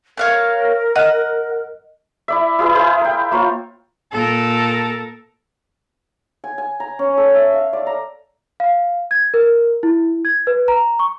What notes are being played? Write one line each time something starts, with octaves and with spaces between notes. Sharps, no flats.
A#4 C#5 F5 F#6
D#5 F#5
E4 D5 E5
E4 G#4 B4
E4 G#4 C5 F5
A#4 G5
A#3 F4 C#5
A#2 A4 A#4
G#5
G#5
A#5
C#4
A4
E5
F5
D5
A#5
F5
G#6
A#4
E4
G#6
B4
A#5
C#6